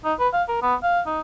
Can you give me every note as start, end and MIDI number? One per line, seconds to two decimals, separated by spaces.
0.05 0.14 63
0.19 0.28 71
0.33 0.43 77
0.49 0.62 70
0.62 0.75 59
0.83 1.00 77
1.06 1.21 63